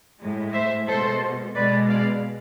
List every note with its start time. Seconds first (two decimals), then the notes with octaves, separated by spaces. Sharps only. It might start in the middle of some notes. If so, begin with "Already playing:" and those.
0.20 A2 G#3
0.53 C5 E5
0.87 B2 G#3 A4 C5
1.55 B2 G#3 B4 D5
1.89 D5 F5